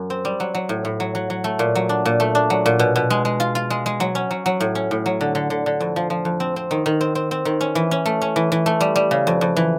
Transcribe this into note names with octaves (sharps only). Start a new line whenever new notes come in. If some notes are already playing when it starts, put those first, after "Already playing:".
Already playing: F#2
C4
G3
F#3
F#3
A2
A2
F#3
F#3
F#3
A3
A#2
F#3
D4
A#2
A3
D4
F#3
A#2
B2
B2
G#3
G#3
F4
F4
G#3
G#3
F#3
C#4
F#3
F#3
A2
C#4
A2
F#3
D3
D3
D3
D3
F2
F3
F3
F2
C4
C4
D#3
D#3
C4
C4
C4
D#3
C#4
E3
C#4
A3
C#4
E3
E3
A3
G3
G3
C#3
F2
F2
E3